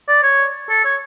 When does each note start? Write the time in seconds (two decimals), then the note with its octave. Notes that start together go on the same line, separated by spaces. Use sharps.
0.08 D5
0.23 C#5
0.69 A4
0.85 C#5